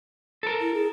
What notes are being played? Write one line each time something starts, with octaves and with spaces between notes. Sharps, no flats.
A4 A#4
E4
G#4